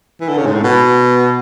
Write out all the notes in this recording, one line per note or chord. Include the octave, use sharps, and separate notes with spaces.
E3
D3
C#3
G#2
A2
B2